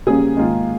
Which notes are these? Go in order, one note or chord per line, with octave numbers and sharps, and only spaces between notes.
C#3 G3 A#3 C#4 G#4
G#2 D#3 A#3 F4